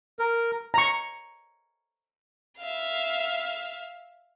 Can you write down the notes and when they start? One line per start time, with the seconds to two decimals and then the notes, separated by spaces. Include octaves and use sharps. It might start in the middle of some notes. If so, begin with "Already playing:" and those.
0.19 A#4
0.74 A#5 C#6
2.59 E5 F5